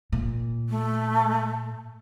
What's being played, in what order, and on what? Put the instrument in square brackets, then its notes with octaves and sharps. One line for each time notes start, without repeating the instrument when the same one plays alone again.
[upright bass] A#2
[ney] A3